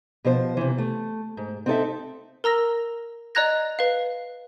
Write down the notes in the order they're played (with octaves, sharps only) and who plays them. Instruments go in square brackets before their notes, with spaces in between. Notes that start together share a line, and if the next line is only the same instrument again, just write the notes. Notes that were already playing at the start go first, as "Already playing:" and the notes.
[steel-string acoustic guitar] B2 F3 C5
C3 E3
A3
G#2
C4 D#4 A4 E5
[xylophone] A#4 A#5 E6 A#6
D5 D#5 A#5 F#6 G#6 A#6
B4 F5